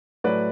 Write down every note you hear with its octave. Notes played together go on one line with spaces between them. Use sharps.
A2 F#3 A3 B4 D5